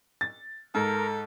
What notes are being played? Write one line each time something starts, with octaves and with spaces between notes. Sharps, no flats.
A6
G#2 A4 A#4